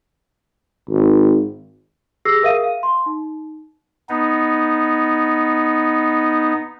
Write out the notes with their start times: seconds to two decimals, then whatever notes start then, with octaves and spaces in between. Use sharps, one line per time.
0.89 G#1
2.25 G4 G#4 E6 A#6 C7
2.42 G#4 A#4 E5 F5 D#7
2.64 F5
2.83 C6
3.06 D#4
4.09 B3 D#4